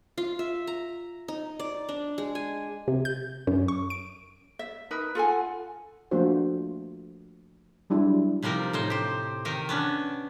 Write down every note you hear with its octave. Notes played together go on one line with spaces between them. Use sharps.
F4
E5
A#5
D#4
D5
D4
G#3
G#5
C3
G6
F#2
C#6
D7
E5
D#4 A#4 B4
F4 A4 F#5 G#5
F3 A3 A#3 D4 F#4 C5
F#3 G3 D4 E4
C3 F3 G3 D#4 A#4
A2 D#4 C5
G4 C5
C3 D#3 D#4 A#4
B3 C#4 D4